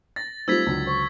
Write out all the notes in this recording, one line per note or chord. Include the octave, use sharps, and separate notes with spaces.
A6 A#6
G3 A3 C4 D#4 F4 E6 G#6 B6
C#2 D3 F#3
C5 C#6